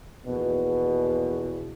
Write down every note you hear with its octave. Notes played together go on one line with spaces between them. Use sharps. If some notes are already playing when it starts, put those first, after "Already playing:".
A#1 E2 B2